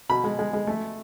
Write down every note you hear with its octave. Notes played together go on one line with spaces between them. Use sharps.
B2 B5
G#3
G#3
G#3
A3